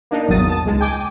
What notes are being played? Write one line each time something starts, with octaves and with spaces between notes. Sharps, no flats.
A#3 D4 D#4
G#1 E2 D#3 F#3 D#6 A6
A5
C#2 G#3
G5 G#5 D6